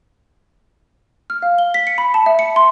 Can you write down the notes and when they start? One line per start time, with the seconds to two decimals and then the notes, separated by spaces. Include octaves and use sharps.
1.30 F6
1.42 F5
1.58 G7
1.74 B6
1.87 C#7
1.98 B5
2.14 A5
2.26 E5
2.39 C#7
2.56 C6